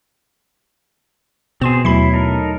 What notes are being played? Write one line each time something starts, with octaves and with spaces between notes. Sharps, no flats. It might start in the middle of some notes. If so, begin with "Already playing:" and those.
B2 C4 G#4 C6 E7
D#2 F#3 A3 E4 B5 C7
D#4 A4 A#4